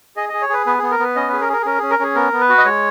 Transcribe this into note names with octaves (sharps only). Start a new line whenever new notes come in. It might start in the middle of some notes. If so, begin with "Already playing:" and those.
G#4 D#5
G#4 D#5
C#5
G#4 B4
B3 B4
B3 G#4
A#4
B3 B4
C#4 D#5
G#4 B4
A#4
G#4
A#4
G#4
C#4 A#4
C#4 G#4
A#4
C#4 G#4
B3 A#4
B3
B4
F#4
D#5
G#3 C#5